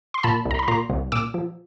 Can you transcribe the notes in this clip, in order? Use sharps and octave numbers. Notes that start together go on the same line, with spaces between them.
C6
A#2 A5 B5
C2
A#5
B5
A#2 A#5 C6
C2
A#2 D6 E6
F3